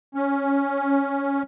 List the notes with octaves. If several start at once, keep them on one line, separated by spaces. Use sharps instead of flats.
C#4